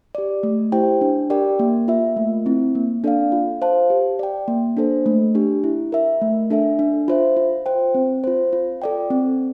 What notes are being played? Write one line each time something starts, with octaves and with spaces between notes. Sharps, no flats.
G4 D5
A3
E4 G4 C5 G5
D4
G4 A#4 D5 G5
A#3
F4 A#4 E5
A3
C4 E4
A#3
D4 A4 D5 F5
F4
C5 F5 A5
G4
D5 G5
A#3
D4 A4 C5
A3
D4 G4
E4
A#4 E5
A3
D4 A4 E5
D4
F4 C5 E5
F4
C5 G5
C4
F4 C5
F4
A4 D5 G5
C4